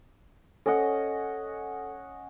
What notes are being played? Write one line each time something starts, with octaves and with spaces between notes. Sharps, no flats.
C#4 A4 D#5 F#5